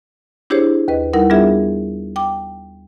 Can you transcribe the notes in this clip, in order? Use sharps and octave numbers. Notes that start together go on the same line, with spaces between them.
D4 E4 G4 G#4 C5 C#5
D#2 B4 D#5
G3 D#4 E4 A#4 F#5
G3 B3 D4 F4 G#4 E5
G5 D6